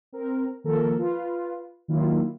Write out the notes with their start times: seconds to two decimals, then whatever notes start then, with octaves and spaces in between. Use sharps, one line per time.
0.13 C4 A#4
0.64 D#3 F3 A#3 A4 A#4
0.98 F4 B4
1.88 D#3 F#3 A#3 E4 F4